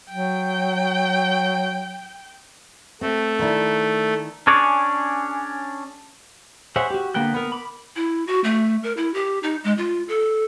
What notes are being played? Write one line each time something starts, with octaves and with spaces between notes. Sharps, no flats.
F#3 G5
A3 C4
D#3 D4 E4
C#4 D4 G#4 C#5 D5
G#4 C5 C#5 E5 F#5
F#4 G4
D3 A#3 B3 G5 F#6
B3 A#4
B5 D6
E4
F#4
A3
A#4
E4
G4
D#4
G#3
F4
A4